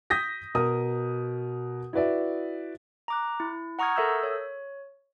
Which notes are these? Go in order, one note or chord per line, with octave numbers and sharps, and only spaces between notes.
D#6 G6 A#6 B6
B2 A#4 D#6
E4 F#4 B4 D5 E5
A#5 D6 F#6
E4
F#5 A#5 C#6 D#6 F6 G#6
A4 A#4 E5 D#6 E6 G6
C#5